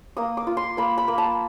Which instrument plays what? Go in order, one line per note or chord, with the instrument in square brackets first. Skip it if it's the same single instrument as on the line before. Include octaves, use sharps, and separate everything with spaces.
[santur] A#3 D#6
D6
F4
C6
A#3 B5
B5
A#3
A5